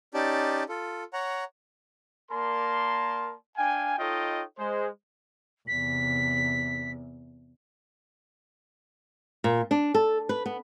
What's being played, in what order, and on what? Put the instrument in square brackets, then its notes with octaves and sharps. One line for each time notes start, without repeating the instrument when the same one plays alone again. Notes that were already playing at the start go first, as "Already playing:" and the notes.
[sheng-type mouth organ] C#4 D#4 G4 D5 A5
F4 A4
C#5 F#5 A#5
[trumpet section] A#3 A#4 D5 A5 C6
D4 F5 G5 G#5
D#4 F4 A4 C#5 D#5 G5
G#3 C5
[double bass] E2 C3 [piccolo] B6
[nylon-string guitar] A#2
D4
A4
B4
B3